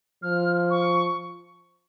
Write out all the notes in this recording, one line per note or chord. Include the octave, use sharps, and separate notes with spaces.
F3 F6
C#6